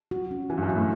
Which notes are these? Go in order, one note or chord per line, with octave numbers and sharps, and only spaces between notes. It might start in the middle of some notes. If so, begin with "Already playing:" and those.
F#4
C#4
E3 F#4
G2
F#2
F#4
A2